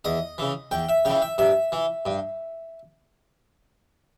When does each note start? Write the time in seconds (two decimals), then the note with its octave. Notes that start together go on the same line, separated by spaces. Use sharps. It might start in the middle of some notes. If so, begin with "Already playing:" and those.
0.05 E2 D#5
0.38 C#3 E3
0.71 E2 G5
0.89 E5
1.05 C#3 E3 G5
1.22 E5
1.38 G2 E5
1.72 E3
2.06 G2